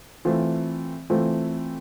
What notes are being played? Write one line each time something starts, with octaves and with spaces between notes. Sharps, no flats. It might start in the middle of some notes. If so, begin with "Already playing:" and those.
E3 A3 C4 F4
E3 A3 C4 F4